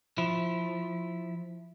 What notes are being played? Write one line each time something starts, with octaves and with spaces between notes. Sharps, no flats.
F3 E4